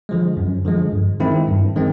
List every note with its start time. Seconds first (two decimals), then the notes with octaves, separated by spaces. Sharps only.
0.09 D3 F3 G#3
0.37 F#2
0.65 D3 F3 G#3
0.93 G2
1.20 D#3 G#3 C4 E4
1.48 G2
1.76 D#3 G#3 C4